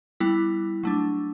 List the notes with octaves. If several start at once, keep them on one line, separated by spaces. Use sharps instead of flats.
G3 B3 E4
F#3 A3 D4